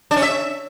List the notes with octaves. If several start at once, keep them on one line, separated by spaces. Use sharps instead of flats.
D4
C#4
E5